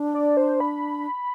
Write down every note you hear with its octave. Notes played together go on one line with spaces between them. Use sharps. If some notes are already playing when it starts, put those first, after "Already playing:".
Already playing: D4
D5
C5
B5